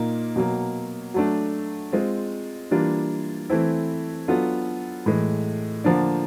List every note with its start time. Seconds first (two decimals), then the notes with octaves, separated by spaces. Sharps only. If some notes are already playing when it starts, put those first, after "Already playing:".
Already playing: A#2 A#3 D#4
0.36 B2 F#3 A#3
1.14 F#3 A3 D4
1.92 G#3 C4 F4
2.71 E3 G3 A#3 D4 F4
3.50 E3 A3 C4 E4
4.28 F#3 B3 D4 F4 A4
5.06 A2 E3 G#3
5.84 D3 F3 A#3 D4